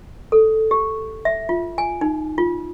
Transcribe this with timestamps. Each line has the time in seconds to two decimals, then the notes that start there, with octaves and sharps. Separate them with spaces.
0.32 A4
0.71 G4
1.25 E5
1.49 F4
1.78 G#5
2.01 D#4
2.38 F4